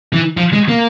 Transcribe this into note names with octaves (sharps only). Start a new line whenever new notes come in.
E3
F3
G#3
A#3